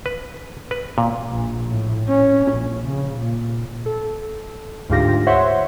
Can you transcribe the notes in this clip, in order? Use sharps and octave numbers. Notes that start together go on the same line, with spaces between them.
B4
B4
A#2
A#1
A2
C#4
A#1
C#3
A#2
A4
D2 G#2 F4 G4 A#6
C5 C#5 E5 F#5 C6